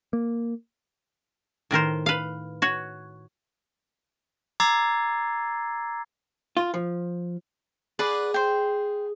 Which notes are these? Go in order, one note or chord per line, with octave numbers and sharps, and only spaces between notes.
A#3
A2 D#3 A#4 C5
B4 F5
F#4 C#5
A#5 D6 E6 G#6 A6 C7
F4
F3
G#4 B4 D5 F#5
C5 G5